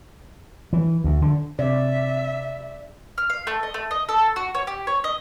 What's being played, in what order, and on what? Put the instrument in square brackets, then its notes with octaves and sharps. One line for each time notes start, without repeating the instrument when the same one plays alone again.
[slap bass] E3
D2
D3
[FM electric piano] C3 [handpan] D5 [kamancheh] E5
[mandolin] F6
F5
A3
D#5
A3
D#5
A4
F#4
C#5
G4
C#5
D#5